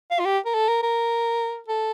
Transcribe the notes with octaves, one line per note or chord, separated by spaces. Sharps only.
F5
F4
G4
A#4
A4
A#4
A#4
A4